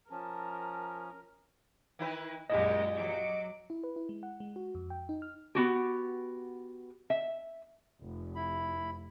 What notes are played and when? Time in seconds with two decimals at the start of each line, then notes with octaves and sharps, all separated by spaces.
0.11 F3 C#4 A#4 A5
1.99 D#3 E4 B4
2.50 A#1 F#2 A#2 G#3 E4 G4 D#5
2.97 F#3 D6
3.70 E4
3.84 B4
3.96 E4
4.09 G#3
4.23 F#5
4.40 G#3
4.56 F#4
4.75 F2
4.90 G5
5.09 D#4
5.22 F6
5.55 B3 F#4 G4
7.10 E5
8.02 F1
8.35 E4 B5